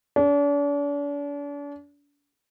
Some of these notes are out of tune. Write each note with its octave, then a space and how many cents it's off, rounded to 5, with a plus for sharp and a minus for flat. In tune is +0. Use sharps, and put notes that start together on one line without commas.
D4 -40